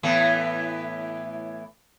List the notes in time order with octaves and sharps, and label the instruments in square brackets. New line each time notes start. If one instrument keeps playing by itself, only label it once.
[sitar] A2 E3 B3